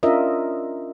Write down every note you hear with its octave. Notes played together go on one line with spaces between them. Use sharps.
C#4 D4 F4 A#4 D#5 E5